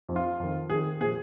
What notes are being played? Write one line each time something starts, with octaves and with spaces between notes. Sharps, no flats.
F2 F3
F4
F2 D#3
F2 D#3 G#4
A#2 F3 G#4